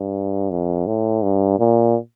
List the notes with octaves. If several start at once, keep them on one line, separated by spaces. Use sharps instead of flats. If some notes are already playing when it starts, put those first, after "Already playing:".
Already playing: G2
F2
A2
G2
A#2